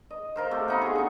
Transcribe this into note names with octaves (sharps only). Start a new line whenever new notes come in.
D#5
F4 A#4 C5
C3 A3 G4
B3 D#4 F4
F#4 G#4
D3 D#4